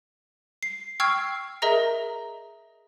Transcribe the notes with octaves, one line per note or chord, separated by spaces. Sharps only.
C7
G5 C#6 E6 F6 G#6 C7
G#4 A#4 D#5 E5 A#5 A#6